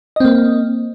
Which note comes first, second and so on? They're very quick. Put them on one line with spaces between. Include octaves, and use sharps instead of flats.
D#5 C4 A#3